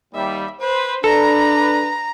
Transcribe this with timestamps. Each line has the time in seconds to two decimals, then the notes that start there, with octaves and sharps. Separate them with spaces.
0.14 D#2 G3 E5
0.60 B4 C5
1.04 D4 A4 B4 A#5